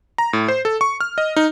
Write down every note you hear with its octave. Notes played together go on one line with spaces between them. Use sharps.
A#5
A2
C5
A4
C#6
F6
D#5
D#4